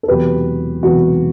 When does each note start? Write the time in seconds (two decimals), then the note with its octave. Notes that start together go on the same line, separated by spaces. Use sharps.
0.03 A4
0.08 E1 E2 C3 F#3 B3 G4 B4
0.83 E1 E2 C3 F#3 B3 F#4